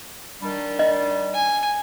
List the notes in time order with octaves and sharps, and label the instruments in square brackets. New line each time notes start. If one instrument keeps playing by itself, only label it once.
[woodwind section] D#3 G3 D4
[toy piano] D#5
[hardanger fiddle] G#5